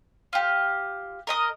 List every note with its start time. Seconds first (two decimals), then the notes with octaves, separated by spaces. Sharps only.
0.33 F4 G4
1.27 A#4 D#5 D#6